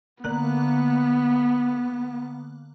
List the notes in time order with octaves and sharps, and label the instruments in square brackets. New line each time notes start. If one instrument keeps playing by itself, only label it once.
[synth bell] D3 A#3 F#6 [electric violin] B3